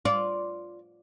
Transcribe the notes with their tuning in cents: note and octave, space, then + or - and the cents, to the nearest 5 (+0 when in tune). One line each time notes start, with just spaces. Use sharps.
F4 +0 D5 -15